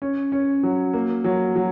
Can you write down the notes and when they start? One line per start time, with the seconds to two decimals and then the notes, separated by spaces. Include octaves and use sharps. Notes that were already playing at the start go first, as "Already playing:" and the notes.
0.02 C#4
0.32 C#4
0.63 F#3
0.93 A#3
1.24 F#3
1.56 F#3